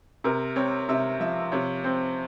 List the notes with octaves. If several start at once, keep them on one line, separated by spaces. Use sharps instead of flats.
C3 A#4
C4 C#5
C3 E5
F3 E5
C3 C#5
C4 C5